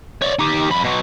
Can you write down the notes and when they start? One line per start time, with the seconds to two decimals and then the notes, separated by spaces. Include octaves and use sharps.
0.22 C#5 D5
0.39 D#4 G4
0.70 F2 B5
0.84 B2 F#3